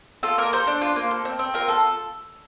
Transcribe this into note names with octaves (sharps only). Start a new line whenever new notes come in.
F4 A4
A#3 A#4
A4 C5
D4
F4
A#3
A4
C4
C4
F4 A#4
A4